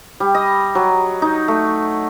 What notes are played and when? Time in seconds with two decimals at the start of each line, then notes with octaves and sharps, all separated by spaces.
0.20 G3
0.35 D#5
0.75 F#3
1.22 D#4
1.48 A3